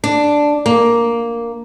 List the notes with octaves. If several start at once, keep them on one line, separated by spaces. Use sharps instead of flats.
D4
A#3